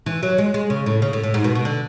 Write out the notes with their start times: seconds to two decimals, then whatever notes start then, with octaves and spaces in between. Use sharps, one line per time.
0.06 E3
0.23 F#3
0.38 G#3
0.54 G#3
0.70 C#3
0.86 A2
1.02 C#3
1.13 A2
1.23 A2
1.34 G#2
1.44 B2
1.55 B2
1.65 D3